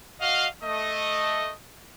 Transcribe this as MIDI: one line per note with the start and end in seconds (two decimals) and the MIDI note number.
0.21 0.47 66
0.21 0.47 75
0.21 0.47 77
0.62 1.53 57
0.62 1.53 75